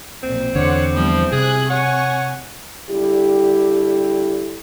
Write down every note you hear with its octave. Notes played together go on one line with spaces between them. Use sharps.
B1 F2 A#2 C4
E2 D3 C5 C#5 F#5 D6
F3 G3 B3 E4
C3 G#4 G#5 F#6
C#5 F#5 G#5 C#6
D3 G3 E4 G4